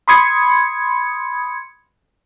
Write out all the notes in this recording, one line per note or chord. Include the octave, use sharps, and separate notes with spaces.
B5 C6 D#6 G#6 C#7